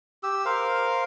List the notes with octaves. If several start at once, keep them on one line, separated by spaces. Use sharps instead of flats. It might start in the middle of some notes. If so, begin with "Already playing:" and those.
G4 E6
A#4 C5 F5